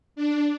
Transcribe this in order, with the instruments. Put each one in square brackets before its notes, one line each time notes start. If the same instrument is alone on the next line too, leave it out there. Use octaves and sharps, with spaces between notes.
[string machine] D4